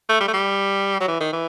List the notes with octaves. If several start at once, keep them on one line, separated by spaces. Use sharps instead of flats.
A3
G3
A3
G3
F#3
E3
D#3
E3